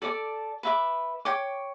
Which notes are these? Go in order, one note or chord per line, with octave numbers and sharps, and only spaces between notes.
A4 D5 A5 D6
B4 E5 B5 D6
C#5 G5 D6